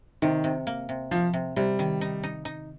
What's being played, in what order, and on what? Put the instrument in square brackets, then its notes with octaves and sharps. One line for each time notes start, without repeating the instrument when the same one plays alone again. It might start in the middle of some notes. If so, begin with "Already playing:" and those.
[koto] C3 [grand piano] D#3
[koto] C3
A#3
C3
[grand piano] F3 [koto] A#3
[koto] C3
[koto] C3 [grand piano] G3
[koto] D#3
D#4
D#4
D#4